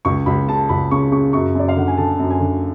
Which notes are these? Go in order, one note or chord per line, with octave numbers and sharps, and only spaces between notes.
C#2 C#6
C#2 B5
C#3 A5
C#2 B5
C#3 C#6
C#3 C#6
F#2 C#6
F#2 D5
F5
D3 F#5
G#5
D3 A5
F#2
G#5
D3